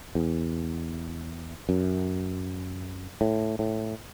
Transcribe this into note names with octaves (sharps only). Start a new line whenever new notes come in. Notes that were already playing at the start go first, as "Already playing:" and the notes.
E2
F#2
A2
A2